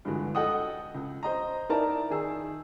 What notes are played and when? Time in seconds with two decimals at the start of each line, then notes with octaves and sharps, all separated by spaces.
0.05 G2 D3 E3 F3 G#3 F#4
0.35 A4 D#5 F#5 G5 D#6
0.94 C#2
1.23 C5 D#5 A#5
1.69 D#4 E4 A#4 D5 A5 A#5
2.10 D#3 D#4 G#4 E6